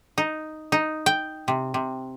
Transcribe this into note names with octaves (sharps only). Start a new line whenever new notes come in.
D#4
D#4
G5
C3
C3